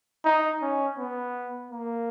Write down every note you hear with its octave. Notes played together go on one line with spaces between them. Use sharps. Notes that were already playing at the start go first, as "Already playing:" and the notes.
D#4
C#4
B3
A#3